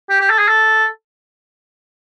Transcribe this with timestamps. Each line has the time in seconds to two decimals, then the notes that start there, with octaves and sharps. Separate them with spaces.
0.10 G4
0.21 G4
0.30 A4
0.39 G#4
0.48 A4